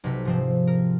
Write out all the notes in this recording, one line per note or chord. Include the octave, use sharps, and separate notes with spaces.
B1 C3 B6
G#2 F3 C4
A#4